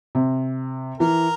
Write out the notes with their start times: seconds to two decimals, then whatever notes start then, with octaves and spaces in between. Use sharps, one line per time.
0.15 C3
1.00 E3 A#4